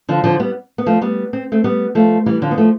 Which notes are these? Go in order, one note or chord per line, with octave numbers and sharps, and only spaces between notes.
D3 F3
D3 F3
G3 B3
B3
F3 A3
G3 B3
C4
A3 C4
G3 B3
F3 A3
E3 G3
D3 F3
B3
F3 A3